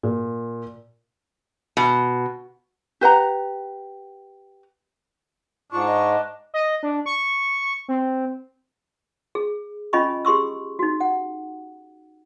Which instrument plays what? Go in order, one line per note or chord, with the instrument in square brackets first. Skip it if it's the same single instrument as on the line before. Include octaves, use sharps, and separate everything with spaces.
[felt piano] A#2
[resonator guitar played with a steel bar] B2
[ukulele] G4 B4 F#5 A#5
[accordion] G#2 [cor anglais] D4 [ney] F4 [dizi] C#6
[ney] D#5
[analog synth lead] D#5
D4
C#6
C4
[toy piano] G#4
C#4 F4 D#5 G#5 B5 C#6
G4 G#4 C6 C#6 E6
D#4 F#4
F#5